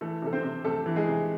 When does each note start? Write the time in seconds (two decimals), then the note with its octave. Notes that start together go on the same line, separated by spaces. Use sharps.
0.01 E3 A3 A4
0.22 C3 A4
0.33 C4 C5
0.43 C3
0.65 C3 A3 A4
0.86 E3
0.96 G#3 G#4
1.07 C3